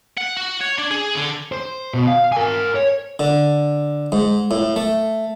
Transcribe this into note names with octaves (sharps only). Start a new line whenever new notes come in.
F#5
F#4
C#5
D4
G#4
D3
C5
B2
F5
A#4 G#5
C#5
D3
G#2
A2
A3